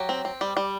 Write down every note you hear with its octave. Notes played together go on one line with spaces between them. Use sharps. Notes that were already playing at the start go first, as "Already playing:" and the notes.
Already playing: F#3 G4
C4
C4
G3
G3